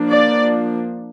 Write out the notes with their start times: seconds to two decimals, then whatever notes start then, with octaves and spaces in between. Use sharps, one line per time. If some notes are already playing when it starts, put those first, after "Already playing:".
Already playing: F3 A#3 D4
0.08 D5